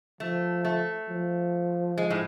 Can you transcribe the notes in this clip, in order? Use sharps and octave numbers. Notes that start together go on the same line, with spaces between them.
F3 A3
A3
F3
G#3
A2